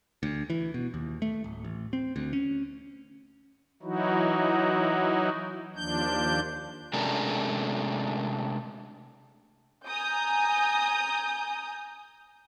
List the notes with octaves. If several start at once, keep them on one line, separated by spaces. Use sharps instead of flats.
D2
E3
B2
D#2
A3
D1
A1
C4
D2
C#4
E3 F#3 D#4 E4 F#4
D#2 F3 D4 G6
C3 G#3 A3 C#4 D4 A#4
G#5 A#5 D#6 G6